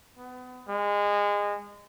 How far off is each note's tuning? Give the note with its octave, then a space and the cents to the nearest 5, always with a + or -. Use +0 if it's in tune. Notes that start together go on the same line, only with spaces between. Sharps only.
B3 +30
G#3 -25